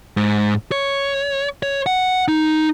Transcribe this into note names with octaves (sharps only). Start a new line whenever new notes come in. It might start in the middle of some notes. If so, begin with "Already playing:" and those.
G#2
C#5
C#5
F#5
D#4